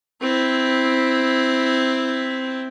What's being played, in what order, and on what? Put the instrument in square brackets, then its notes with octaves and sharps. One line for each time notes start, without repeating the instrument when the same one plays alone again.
[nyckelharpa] C4 E4